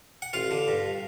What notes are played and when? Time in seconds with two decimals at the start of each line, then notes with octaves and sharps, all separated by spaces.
0.22 F#5
0.33 A1 F4 F5
0.51 D3
0.68 G2